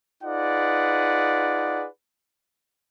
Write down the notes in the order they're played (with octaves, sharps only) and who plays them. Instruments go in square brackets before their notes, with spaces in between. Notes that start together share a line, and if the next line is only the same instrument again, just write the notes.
[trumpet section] D#4 F4 G#4 B4 D5 F#5